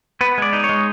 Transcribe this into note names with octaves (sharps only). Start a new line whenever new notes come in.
B3 B4
G#3 D5
D#4
C#5
G#3